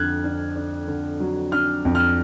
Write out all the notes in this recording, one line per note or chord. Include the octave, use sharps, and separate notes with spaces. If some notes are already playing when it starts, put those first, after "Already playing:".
Already playing: F2 D3 F6 F#6 G#6
D4
D4
D3
F#3
D4 F6
F2
F6